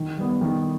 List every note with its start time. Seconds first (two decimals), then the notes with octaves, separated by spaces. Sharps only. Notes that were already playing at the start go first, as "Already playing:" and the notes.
Already playing: D#3
0.18 G3 B3
0.41 D#3